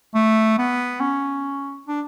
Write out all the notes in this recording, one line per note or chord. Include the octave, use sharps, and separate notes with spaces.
A3
B3
C#4
D4